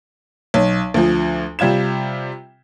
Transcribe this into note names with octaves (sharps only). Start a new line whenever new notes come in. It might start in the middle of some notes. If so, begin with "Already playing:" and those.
B1
D2 F3
C3 G3 F4 G#6 E7